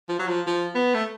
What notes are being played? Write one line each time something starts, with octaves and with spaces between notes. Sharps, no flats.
F3
F#3
F3
F3
B3
A3